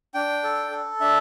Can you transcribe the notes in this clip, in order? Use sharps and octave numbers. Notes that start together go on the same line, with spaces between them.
D4 G5
A4
A4
D4 E5